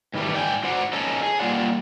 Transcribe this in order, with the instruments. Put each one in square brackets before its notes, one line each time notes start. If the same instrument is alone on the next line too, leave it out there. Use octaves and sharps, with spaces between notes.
[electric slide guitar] G#2 D#3 E3 G3 A3
G#2 D5 G5 G#5
G#2 F#4 C5 D5 F#5
C#4 D#4 A4
G#4
G3 A#3 F4 D5 F#5